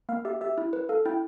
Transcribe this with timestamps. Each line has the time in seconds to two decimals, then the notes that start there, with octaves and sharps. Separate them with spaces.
0.09 A#3 F5
0.25 G4 E5
0.41 G4 E5
0.58 E4
0.73 B4
0.89 A4 F5
1.06 E4 G5